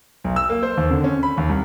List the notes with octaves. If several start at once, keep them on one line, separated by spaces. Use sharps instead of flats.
B1
E6
A#3
C5
D#2
D3
C#4
B5
D#2
C2